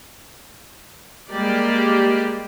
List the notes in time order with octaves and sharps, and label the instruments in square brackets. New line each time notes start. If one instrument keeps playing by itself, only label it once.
[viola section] G3 G#3 A#3 G4 D5